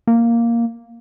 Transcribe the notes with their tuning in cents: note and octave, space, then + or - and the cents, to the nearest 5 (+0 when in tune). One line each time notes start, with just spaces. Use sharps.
A#3 +0